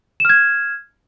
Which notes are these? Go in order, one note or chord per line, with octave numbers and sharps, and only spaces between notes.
F6 G#6 E7